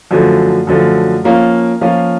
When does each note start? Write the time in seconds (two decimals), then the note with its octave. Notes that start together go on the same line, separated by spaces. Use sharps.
0.11 F#2 D3 F3 A3
0.67 F#2 D3 F3 A3
1.24 F3 A#3 C#4 F4
1.81 F3 A#3 C#4 F4